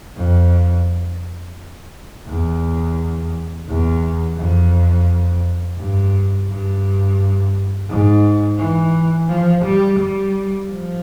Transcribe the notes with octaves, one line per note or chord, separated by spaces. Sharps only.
F2
E2
E2
F2
G2
G2
G#2
E3
F3
G3
G3
F3